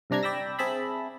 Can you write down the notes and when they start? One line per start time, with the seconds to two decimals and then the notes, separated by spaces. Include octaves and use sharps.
0.10 G2 C3 D4 A#5 G#6
0.23 D5 G5 B5 E6 A#6
0.59 C4 G#4 E5 A5 B5